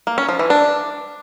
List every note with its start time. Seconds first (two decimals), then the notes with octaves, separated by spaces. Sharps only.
0.07 A#3
0.18 C#4
0.29 F3
0.39 E3
0.50 D4